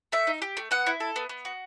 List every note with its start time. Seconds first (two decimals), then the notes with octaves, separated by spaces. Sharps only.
0.12 A3 E5
0.27 D#4
0.42 G4
0.57 A3
0.71 B3 F#5
0.86 E4
1.00 A4
1.16 B3
1.29 B3
1.45 F#4